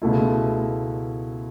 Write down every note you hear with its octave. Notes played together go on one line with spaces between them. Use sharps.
C#2 B2 A3 E4